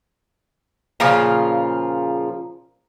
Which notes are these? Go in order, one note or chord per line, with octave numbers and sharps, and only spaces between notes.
A#2 C#3 F3 F4